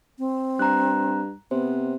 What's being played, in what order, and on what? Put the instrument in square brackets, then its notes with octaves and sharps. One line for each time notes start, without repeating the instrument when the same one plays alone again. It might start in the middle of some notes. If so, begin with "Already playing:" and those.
[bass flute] C4
[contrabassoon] G2 [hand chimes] A#5 F#6
[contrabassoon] C3 [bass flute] B3 [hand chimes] C5